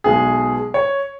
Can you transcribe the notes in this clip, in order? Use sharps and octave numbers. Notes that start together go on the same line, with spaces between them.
B1 B2 G#3 G#4
C#5